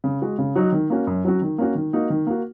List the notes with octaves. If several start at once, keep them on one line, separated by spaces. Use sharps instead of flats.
C#3
G#3 F#4
C#3
F#3 D#4 F#4
D#3
A#3 C#4 F#4
F#2
F#3 C#4 F#4
D#3
A#3 C#4 F#4
D#3
A#3 D#4 F#4
D#3
A#3 F#4